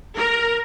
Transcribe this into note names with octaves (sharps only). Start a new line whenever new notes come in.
A#4